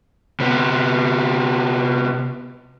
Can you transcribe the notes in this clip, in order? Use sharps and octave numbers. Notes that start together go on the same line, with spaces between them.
C3 B3